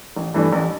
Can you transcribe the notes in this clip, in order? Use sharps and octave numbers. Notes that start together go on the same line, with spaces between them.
A1
G2 E3 A3 D4
A1